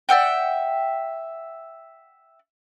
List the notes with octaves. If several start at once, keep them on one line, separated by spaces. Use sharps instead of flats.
D5 E5 F#5 G5